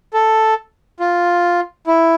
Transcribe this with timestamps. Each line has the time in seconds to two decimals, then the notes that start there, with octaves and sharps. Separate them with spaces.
0.14 A4
1.00 F4
1.87 E4